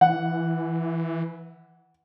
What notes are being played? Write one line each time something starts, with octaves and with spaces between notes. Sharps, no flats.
E3 F#5